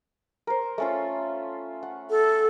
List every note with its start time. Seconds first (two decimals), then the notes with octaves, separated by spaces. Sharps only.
0.47 A#4 C5
0.78 A3 C#4 F4
1.83 F#5
2.10 A4